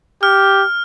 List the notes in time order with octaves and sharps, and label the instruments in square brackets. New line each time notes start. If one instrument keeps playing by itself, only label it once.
[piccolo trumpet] G4 [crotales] F6